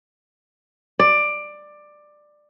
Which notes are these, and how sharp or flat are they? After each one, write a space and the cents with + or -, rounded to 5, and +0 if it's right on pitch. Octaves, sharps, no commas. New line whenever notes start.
D5 +15